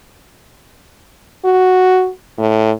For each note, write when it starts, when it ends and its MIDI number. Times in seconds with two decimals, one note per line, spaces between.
1.45 2.09 66
2.38 2.72 45